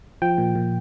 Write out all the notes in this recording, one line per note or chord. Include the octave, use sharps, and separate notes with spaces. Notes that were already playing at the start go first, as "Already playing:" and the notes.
F3 G5
A#2
A#2